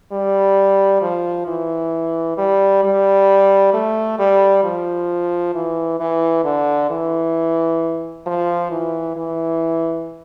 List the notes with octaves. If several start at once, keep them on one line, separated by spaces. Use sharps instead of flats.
G3
F3
E3
G3
G3
A3
G3
F3
E3
E3
D3
E3
F3
E3
E3